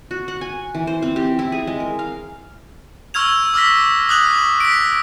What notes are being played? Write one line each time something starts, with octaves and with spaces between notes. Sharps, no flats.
F#4
F#5
G#5
E3
C5
C4
G4
E4
G#4
G#3
A#4
F5
C#6 E6 F6 G#6 F7
D6 E6 F6 A#6 B6
D#6 F#6 F#7
B6 D7